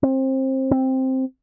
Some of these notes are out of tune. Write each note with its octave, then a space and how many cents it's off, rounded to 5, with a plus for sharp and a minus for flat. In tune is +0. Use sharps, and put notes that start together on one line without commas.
C4 +25
C4 +5